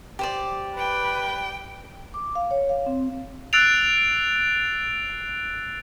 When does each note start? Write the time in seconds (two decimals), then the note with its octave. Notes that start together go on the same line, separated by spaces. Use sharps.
0.19 G4 C5 D5
0.76 B4 G5
2.14 D6
2.35 F5
2.51 C#5
2.69 F5
2.86 C4
3.53 E6 F#6 A6 C7 D7 F7